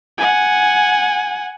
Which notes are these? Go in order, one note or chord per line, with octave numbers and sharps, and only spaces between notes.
F#5 G#5